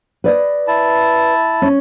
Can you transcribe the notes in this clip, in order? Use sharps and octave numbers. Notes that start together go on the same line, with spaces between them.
B4 D5 D#5
E4 A5
C#4